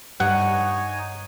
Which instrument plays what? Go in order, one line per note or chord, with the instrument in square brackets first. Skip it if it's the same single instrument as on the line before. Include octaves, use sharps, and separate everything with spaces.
[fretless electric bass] G2 [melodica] D#4 C#5 G#5 [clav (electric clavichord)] F#5